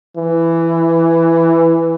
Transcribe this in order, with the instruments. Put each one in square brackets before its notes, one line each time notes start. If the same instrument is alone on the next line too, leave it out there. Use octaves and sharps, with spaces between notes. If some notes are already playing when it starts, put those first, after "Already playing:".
[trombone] E3